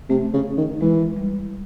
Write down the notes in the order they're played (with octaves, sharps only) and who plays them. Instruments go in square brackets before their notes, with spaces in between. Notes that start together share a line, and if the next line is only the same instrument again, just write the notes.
[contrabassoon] C3 [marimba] A3
[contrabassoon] C#3
D#3
[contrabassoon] E3 [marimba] G#3
[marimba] G3